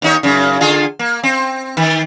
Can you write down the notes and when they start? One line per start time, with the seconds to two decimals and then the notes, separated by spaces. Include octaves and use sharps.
0.02 D#2 D#4 C#5
0.23 F#2 C#3
0.61 D3 F4 G#4
0.99 A#3
1.23 C4
1.77 D#3